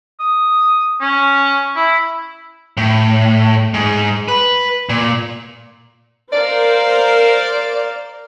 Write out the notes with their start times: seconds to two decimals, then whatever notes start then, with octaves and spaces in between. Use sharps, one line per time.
0.19 D#6
1.01 C#4
1.76 E4
2.77 A2
3.74 G#2
4.28 B4
4.89 A#2
6.33 A#4 C5 D5 F5